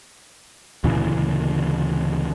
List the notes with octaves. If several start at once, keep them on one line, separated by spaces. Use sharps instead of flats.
D2 A#2 C#3 E3